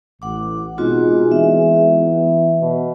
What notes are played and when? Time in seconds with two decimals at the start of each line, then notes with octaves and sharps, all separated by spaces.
0.22 A1 F#5 D6
0.78 B2 G#3 C4 D#4 F4 F#4
1.31 E3 B3 E5
2.61 B2